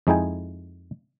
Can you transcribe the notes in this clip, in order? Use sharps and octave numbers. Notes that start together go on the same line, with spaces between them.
F2 G#3 D#4 E4 G5 G#5